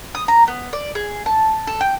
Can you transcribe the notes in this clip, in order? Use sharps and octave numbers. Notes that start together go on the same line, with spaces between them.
D#6
A#5
B3
D5
G#4
A5
A4
G5